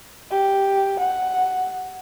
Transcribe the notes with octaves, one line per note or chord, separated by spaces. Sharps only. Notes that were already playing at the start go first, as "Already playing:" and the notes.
G4
F#5